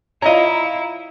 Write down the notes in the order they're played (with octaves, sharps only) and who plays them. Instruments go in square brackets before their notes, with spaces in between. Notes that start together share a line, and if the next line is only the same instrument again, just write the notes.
[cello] E4 [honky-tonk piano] F4 A#5 [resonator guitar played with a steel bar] C#5 D#5